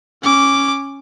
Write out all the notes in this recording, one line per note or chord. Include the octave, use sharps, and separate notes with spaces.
C#4 D6